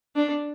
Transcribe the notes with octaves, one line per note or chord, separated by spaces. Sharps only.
D4